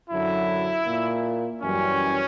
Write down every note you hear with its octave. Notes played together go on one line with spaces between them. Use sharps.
F#2 D3 F#3 E4
A#2 A#3
F#2 E3 G3 C#4